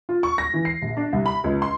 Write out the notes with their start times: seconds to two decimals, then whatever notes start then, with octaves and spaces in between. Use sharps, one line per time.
0.09 F4
0.23 C#6
0.38 A#6
0.54 E3
0.65 C7
0.82 A#1
0.97 D4
1.13 C2
1.26 B5
1.44 C#2
1.62 C6